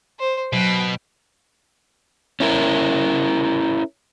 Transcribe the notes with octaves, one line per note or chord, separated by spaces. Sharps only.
C5
B2 F#3 G5
C#4 E4 A#4